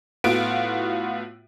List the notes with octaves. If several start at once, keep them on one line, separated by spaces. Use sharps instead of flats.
A2 B3 F4 F#4 D7